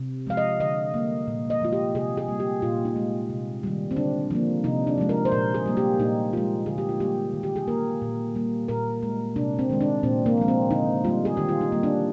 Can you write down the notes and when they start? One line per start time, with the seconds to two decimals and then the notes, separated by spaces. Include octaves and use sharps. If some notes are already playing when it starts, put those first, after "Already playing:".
Already playing: C3
0.27 F3 G#3 F5
0.37 D#5
0.60 D3 D#5
0.94 G3 A#3
1.27 A#2
1.50 D#5
1.61 F3 G#3 F4
1.73 G4
1.95 C3 G#4
2.17 G#4
2.28 G3 A#3
2.40 G4
2.62 A#2 F4
2.85 D#4
2.96 G#3
3.29 C3
3.63 D#3 G3
3.91 C4
3.96 D3 D4
4.31 F3 A#3
4.64 C3 D#4
4.87 D4
4.98 F3 G#3
5.09 A#4
5.25 C5
5.32 A#2 A#4
5.54 G#4
5.66 G3 A#3
5.77 G4
5.99 A#2 D#4
6.33 F3 G#3 F4
6.66 D3 G#4
6.78 G4
6.89 F4
7.00 G3 A#3 G4
7.34 D#3
7.43 G4
7.56 G#4
7.68 A#3 A#4
8.02 A#2
8.35 G3 A#3
8.68 A#2 A#4
9.03 G#3
9.36 C3 D4
9.59 C4
9.70 D#3 G#3
9.81 D4
10.03 A#2 C4
10.26 A#3
10.37 F3 G#3
10.48 C4
10.71 D3 D#4
11.04 G3 A#3 F4
11.25 G#4
11.37 D#3 G4
11.48 F4
11.61 D#4
11.72 G3 A#3
11.83 D4